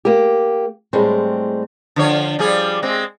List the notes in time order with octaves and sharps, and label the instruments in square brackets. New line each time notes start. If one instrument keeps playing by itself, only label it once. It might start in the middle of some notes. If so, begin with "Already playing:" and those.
[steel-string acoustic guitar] A#3 G4
A2 G3 G#3 C4
[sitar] D3 F3 C#5
F3 G3 G#4
G#3 C4